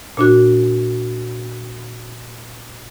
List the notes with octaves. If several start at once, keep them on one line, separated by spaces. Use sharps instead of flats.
A#2 D4 F#4